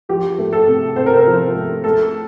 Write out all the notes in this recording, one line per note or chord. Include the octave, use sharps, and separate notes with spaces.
F3 G4
A3
A4
C3
C3 C5
A#4
C5
F3
A3
A3 A4